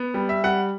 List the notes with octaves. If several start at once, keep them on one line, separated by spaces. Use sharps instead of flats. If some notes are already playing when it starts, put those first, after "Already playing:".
Already playing: B3
G3
E5
G3 F#5